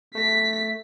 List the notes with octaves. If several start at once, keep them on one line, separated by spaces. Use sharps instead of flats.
A3 A#6 B6